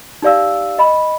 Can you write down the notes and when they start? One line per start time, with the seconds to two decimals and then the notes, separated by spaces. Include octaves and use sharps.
0.22 D#4 G4 D5 F5 E6
0.79 D#5 B5